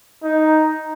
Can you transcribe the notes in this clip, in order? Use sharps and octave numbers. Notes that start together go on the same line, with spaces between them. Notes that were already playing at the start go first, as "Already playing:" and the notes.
D#4